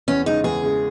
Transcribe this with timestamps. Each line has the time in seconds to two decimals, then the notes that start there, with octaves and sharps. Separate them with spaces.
0.08 E2 C#4
0.26 C#3 G#3 D#4
0.44 E2 G#4
0.63 C#3 G#3